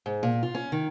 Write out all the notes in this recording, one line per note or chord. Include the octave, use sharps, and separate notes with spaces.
G#2
A#2
F4
C#4
D#3